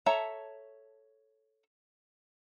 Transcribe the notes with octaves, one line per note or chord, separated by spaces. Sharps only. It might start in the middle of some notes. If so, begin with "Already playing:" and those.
A4 C#5 E5 A5 A#5